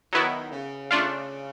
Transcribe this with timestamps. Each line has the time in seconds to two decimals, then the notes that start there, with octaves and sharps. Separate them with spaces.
0.13 D#3 F#3 B3 E4
0.52 C#3
0.91 C#3 A3 D4 F4